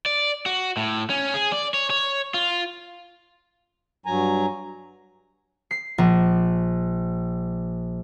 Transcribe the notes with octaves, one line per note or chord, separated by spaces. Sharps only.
D5
F#4
A2
C#4
G#4
D5
C#5
C#5
F4
G2 F#3 G#5 A#5
C7
A#1